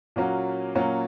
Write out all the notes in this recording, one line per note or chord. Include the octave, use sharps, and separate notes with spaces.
A#2 F#3 A#3 C#4 F#4
A#2 F#3 A#3 C#4 F#4